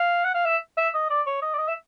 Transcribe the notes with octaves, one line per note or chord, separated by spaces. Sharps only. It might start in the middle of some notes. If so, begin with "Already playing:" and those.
Already playing: F5
F#5
F5
E5
E5
D#5
D5
C#5
D#5
D5
D#5
E5